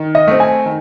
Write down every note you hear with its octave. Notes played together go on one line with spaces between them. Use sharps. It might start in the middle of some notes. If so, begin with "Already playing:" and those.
Already playing: D#3
D#5
A3 C4
G#5
D#3